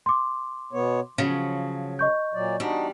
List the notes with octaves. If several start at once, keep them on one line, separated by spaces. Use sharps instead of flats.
C6 D6
B2 B3 C#5
C#3 F3 F#3
D#5 C#6 G6
A#2 F#3 D5
E2 G3 D4 D#4 F#4